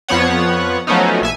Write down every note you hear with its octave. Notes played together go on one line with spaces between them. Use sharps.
F2 F3 B3 C#5 F#5
F3 F#3 A3 B3 C#4 D#4
A#1 E5 G#5